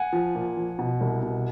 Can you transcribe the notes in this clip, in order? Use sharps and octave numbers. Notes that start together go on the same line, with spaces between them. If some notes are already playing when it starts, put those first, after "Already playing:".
Already playing: F#5 G#5
F3
A#2
F3
B2
C2
B2